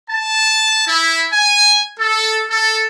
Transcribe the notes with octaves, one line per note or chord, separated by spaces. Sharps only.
A5
E4
G#5
A4
A4